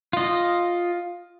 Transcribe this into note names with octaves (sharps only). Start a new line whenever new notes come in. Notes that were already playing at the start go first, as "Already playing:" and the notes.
F4 D#5